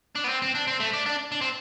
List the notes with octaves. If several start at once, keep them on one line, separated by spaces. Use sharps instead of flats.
D4
B3
C4
C4
D4
C4
A3
D4
D4
D4
C4